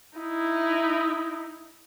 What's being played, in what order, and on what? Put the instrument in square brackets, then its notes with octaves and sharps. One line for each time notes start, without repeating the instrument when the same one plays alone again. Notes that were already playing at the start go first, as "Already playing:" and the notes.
[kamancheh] D#4 E4